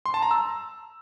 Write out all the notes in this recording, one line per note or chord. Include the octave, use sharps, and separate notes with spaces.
C6
A5
A#5
E6